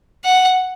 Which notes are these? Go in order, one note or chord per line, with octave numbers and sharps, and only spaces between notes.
F#5